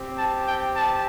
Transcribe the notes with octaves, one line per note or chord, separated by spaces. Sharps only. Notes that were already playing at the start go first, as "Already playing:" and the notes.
Already playing: C4 G4
A5
G5
A5